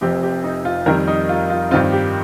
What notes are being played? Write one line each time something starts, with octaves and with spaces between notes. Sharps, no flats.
F1 F2 F3 C4 G4
G4
D#4
F4
F2 D#3 G3 A#4
D#4
F4
F4
G2 D#3 C4 F4
G4